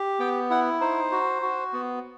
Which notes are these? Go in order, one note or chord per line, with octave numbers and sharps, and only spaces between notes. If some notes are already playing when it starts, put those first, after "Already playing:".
Already playing: G4
B3 G5
E4 F#5
D#4 C5
F#4
F#4
B3